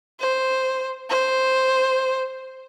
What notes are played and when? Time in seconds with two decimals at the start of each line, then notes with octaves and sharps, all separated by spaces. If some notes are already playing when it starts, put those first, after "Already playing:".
0.20 C5
1.10 C5